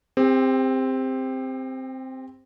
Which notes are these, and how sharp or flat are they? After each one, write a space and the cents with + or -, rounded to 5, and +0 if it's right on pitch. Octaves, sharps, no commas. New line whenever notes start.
C4 +0 G4 +40